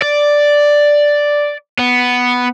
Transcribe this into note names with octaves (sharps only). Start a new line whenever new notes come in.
D5
B3